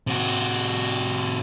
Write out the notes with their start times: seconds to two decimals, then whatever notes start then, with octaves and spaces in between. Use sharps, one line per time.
0.07 C3 F#4